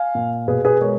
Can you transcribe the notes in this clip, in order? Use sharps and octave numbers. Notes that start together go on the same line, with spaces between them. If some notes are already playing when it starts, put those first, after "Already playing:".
Already playing: F5 G#5
A#2
B2 G#4 B4
G#4 B4
G#3 A#4 C#5